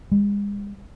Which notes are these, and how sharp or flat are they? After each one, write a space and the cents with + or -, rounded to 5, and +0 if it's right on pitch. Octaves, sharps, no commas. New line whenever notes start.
G#3 -40